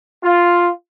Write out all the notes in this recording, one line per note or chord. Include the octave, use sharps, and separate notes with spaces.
F4